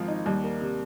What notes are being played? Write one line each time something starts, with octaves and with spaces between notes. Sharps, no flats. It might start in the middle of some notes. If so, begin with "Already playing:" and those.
Already playing: G#1 D#3 F3 G#3
D#4
D#2 G3
A#3
C3